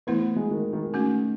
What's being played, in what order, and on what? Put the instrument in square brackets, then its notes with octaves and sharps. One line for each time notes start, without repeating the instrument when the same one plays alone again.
[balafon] E3 A3 E4 B4 [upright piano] B3
[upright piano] G#3
D#3
D#3
[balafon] A3 C#4 F#4